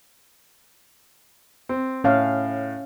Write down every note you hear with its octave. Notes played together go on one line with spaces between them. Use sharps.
C4
A2 C#4 F5